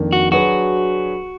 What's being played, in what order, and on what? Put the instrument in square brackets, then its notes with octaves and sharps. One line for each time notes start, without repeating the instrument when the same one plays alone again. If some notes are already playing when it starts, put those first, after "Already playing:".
Already playing: [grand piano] F2 D#3 A#3 D4
[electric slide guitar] F#4
[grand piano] F#3 D4 G#4 B4 [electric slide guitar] F#4